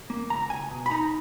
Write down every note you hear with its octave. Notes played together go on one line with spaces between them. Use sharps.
A#3
C#2 A#5
C#2 G#5
B2
B5
D#4 A#5